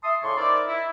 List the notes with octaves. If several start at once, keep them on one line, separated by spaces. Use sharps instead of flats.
E5 A5 C6 D#6
A2 C#3 D5 A5 C6 C#6
D#4 E4 A#4 C5 D5
E4